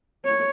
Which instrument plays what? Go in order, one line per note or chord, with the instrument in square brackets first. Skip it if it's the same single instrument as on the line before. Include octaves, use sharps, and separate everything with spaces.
[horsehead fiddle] C#5